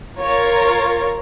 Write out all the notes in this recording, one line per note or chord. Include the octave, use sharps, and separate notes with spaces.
F4 A#4 C#5